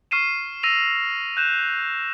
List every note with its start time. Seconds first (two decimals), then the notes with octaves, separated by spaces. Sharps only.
0.11 C#6 F6 C7 D#7 E7
0.63 E6 A#6 D#7 F7
1.37 F#6 G6 E7